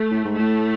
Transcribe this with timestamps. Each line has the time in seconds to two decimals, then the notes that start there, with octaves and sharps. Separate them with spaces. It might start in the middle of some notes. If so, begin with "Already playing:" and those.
Already playing: A3
0.11 A2
0.25 G#2
0.31 A3
0.39 A2